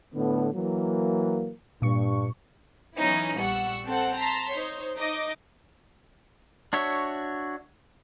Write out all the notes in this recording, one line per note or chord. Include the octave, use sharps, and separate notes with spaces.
A2 D3 B3
E3 F#3 A#3
G2 A#2 C#6
E3 F#3 B3 C#4 D#4 E4
A#1 G3 F#5 C#6 E6
C4 A4 F#5
A5 A#5 C6 B6
D#4 C5 C#5
D#4 D#5 D6
D4 F#4 C#5 E5